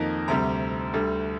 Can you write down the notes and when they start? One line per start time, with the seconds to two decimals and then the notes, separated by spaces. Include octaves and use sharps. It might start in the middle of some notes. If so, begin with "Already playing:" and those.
Already playing: F2 D#3 A#3 D#4
0.28 D2 C3 G3 A#5
0.94 D2 D3 G3